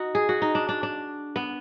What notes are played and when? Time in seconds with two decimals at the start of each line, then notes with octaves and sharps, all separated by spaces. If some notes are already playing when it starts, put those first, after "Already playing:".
Already playing: D#4 F#4
0.15 G#4
0.29 F#4
0.42 D#4
0.55 D4
0.69 D4
0.83 D4
1.36 B3